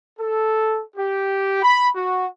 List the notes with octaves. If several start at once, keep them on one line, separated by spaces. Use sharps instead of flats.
A4
G4
B5
F#4